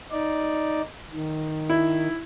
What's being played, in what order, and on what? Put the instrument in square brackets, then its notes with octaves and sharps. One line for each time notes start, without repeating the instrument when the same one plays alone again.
[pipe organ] D#4 D5
D#3
[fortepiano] E4